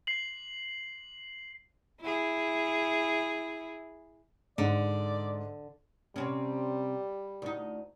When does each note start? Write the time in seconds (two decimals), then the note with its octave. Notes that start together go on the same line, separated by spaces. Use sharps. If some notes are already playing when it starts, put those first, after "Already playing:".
0.07 C7 F#7
2.01 E4 G#4
4.58 G#2 D3 D5
6.16 C3 G3 C4 C#4
7.42 D2 D#4